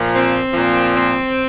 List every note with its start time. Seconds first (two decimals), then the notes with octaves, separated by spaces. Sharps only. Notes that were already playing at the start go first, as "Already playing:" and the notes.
Already playing: A#2 F3
0.14 C4
0.54 A#2 F3
0.94 C4